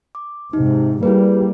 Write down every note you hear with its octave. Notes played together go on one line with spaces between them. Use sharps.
D6
G#2 C3 D#4
G3 A#3 E4 G#4 B4